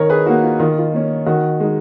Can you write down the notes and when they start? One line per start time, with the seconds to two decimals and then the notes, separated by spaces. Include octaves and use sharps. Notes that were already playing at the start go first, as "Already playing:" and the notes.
Already playing: D#3 A#4 C#5
0.10 G#4 B4
0.26 A#3 D#4 F#4
0.43 F4
0.60 D#3 F4
0.78 F4
0.94 A#3 C#4
1.26 D#3 F#4
1.60 G#3 D#4